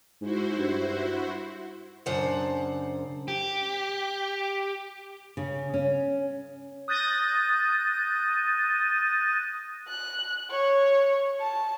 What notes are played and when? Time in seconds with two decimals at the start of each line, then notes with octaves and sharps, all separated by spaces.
0.21 G#2 E4 F#4 C5
0.57 G2
2.06 F#2 C#3 D4 C5 F#5
3.28 G4
5.37 C#3
5.74 C#4
6.88 D#6 F#6 G6 A6 A#6 D#7
9.88 F#6
10.51 C#5
11.40 A5